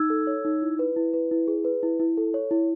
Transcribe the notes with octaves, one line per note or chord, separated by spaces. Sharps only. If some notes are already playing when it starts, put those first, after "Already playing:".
Already playing: D#4 E6 G#6
A4
C#5
D#4
E4
B4
E4
B4
E4
G#4
B4
E4
E4
A4
C#5
E4